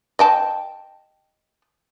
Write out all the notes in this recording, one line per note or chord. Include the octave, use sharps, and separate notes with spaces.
D#5 G5 A5